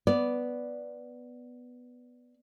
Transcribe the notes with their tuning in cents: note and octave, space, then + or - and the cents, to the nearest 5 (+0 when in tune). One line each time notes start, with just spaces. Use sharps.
B3 +0 D5 +0